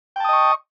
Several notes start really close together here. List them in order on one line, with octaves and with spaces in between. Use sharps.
G5 A5 D#6 D#5 C#6